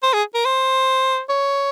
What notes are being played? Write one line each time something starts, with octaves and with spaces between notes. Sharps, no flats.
C5
G#4
A#4
C5
C#5